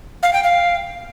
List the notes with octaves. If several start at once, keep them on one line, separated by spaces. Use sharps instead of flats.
F5
G5
F5